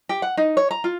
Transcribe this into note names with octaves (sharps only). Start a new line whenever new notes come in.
G4
F#5
D#4
C#5
A#5
F4